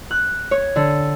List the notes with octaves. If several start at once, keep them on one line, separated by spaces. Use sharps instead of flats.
F#6
C#5
D3